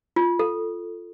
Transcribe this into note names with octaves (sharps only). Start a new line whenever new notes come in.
F4
A4